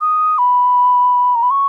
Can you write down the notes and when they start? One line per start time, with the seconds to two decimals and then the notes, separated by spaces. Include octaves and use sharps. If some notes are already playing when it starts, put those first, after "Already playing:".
0.01 D#6
0.38 B5
1.35 A#5
1.43 B5
1.51 C#6